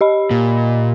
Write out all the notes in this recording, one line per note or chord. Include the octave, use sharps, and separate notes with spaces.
G4 D#5 B5
A#2